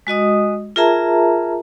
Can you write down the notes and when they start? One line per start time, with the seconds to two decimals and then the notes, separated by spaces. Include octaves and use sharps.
0.07 G#3 F#4 D#5 D#6
0.76 F4 G#4 A#4 E5 A5 A#5